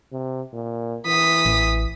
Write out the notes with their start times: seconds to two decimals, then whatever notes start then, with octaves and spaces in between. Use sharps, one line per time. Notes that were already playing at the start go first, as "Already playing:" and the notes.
0.12 C3
0.53 A#2
1.06 E3 D#6 B6
1.46 A1